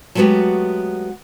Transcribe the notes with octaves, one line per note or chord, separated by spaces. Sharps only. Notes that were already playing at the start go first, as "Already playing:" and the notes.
F#3 G#3 A3 B3 F#4 G4